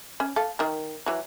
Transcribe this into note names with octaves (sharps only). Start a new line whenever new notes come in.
C#4
A4 F5
D#3 A#4
E3 F#3